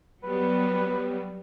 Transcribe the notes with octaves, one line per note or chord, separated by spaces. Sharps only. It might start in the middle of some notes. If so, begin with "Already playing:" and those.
F#3 G3 B3 B4